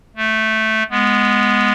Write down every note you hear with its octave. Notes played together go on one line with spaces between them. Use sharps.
A3
G#3 B3